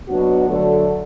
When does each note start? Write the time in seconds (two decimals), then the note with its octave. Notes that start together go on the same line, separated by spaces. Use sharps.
0.09 B2 F#3 B3 D4 F#4
0.49 D3 F#3 A3